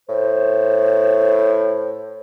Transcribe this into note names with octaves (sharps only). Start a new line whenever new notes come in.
A2 C5